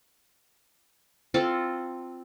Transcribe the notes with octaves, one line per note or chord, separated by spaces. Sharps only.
C4 F4 A4 A5